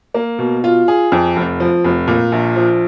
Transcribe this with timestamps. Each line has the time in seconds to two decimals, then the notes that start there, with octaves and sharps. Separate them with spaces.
0.14 A#3
0.39 B2
0.64 F4
0.88 G#4
1.12 F2
1.36 F1
1.60 F3
1.84 F1
2.08 A#2
2.32 A#1
2.56 F3